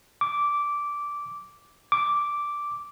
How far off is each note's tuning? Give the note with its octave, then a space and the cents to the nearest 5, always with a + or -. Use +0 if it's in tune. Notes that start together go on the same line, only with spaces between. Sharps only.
D6 -10
D6 -5